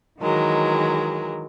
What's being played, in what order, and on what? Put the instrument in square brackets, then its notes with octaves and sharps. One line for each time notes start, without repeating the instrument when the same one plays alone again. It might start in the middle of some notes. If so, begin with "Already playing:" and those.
[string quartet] D#3 E3 F#3 G#3 A#4